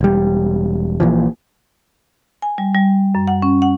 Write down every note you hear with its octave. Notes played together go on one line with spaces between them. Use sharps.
E1 G3
A#1 A#2 E3 F3
G#5
G3
G3
F#2
F#5
C#4
F#5